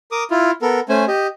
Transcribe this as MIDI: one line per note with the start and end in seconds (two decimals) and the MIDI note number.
0.12 0.23 70
0.12 0.23 86
0.12 0.23 87
0.31 0.51 64
0.31 0.51 65
0.62 0.80 59
0.62 0.80 69
0.62 0.80 70
0.89 1.05 57
0.89 1.05 61
0.89 1.05 72
0.89 1.05 80
1.08 1.27 67
1.08 1.27 75